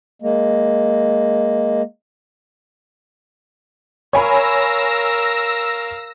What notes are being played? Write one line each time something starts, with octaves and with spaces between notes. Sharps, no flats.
G#3 A#3
A#4 C#5 F5 G#5 B5 E6 A#6